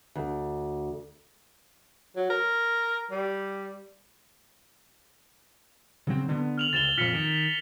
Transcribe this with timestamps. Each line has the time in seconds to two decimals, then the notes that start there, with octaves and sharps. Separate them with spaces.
0.16 D2
2.16 F#3
2.30 A#4
3.11 G3
6.07 C#3 F#3 C4
6.28 D3 B3
6.58 F6 F7 F#7
6.73 C#2 A6 E7 G7
6.97 F2 A#2 F6 B6 C#7
7.13 D#3